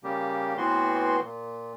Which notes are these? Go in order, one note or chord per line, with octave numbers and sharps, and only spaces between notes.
C#3 G3 A#3 G4
A2 E3 B3 C4 F#4 C6
A#2